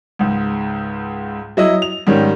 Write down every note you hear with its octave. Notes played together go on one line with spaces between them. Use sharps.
C#2 G#2
F#3 E4 D#5 D#6
F7
G#2 D#3 G3 C#4